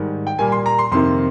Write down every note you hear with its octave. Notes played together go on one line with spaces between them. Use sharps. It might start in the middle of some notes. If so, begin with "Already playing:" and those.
Already playing: G#2 D#3 G3
G5
A#2 G3 A#3 G#5
C6
A#5
C6
F2 C3 D#3 A#3 C6